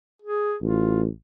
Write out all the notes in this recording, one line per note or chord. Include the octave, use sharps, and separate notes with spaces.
G#4
A1 F4